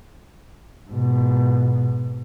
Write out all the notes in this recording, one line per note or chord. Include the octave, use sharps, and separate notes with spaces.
G#2 B2